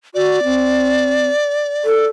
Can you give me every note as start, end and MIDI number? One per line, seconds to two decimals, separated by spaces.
0.15 0.39 66
0.15 2.08 74
0.44 1.28 60
1.85 2.06 69